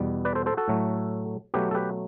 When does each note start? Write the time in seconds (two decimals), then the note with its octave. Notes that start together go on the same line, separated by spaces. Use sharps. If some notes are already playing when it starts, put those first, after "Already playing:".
Already playing: E2 B2 G3
0.25 B4 D5
0.35 A4 C5
0.46 A4 C5
0.57 F#4 A4
0.68 A2 F#3 A3
1.54 B2 F#3 A3 G4 B4
1.71 A4
1.75 G4 B4